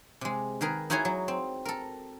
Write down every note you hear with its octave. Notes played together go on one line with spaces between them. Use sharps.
C3 G#3
D#3 G#4 A#4 B4
D#4 E4 F#4 G#4 C#5 G#5
F#3
C4
A4 A#4